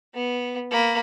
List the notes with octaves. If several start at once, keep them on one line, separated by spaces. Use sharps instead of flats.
B3
A#3 B5